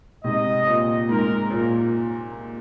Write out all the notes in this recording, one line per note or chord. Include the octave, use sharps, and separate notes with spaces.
G#2 C3 D#5
A#2
G#2 A#4
A#2